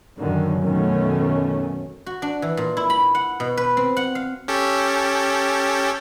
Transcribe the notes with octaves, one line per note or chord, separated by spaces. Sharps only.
F#2 D3 D#3
F#2 B2 D#3 A3 C#4
F#4
D4
E3
A#2
E4
B5
F#5
B2
B4
C4
F#5
F5
C#4 G4 A4